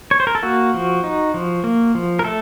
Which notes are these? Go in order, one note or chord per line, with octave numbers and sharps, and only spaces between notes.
C#5
C5
A#4
A4
A#3 F#4
F3
D#4
F3
A#3
F3
A#4
A3 A4